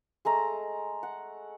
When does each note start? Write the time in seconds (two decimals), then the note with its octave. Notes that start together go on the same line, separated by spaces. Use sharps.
0.25 G#3 A3 A#5
1.03 F#5